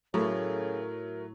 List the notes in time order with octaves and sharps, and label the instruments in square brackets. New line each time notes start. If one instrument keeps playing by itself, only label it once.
[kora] A2 [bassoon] C#3 [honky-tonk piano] F#3 A3 [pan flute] A#4